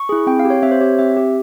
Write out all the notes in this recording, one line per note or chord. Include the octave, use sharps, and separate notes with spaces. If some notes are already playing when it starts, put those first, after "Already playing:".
Already playing: C#6
E4 G#4
C4 G5
F5
G4
C#5
C4 E5
C5
G4 C#5
C4 E5
G4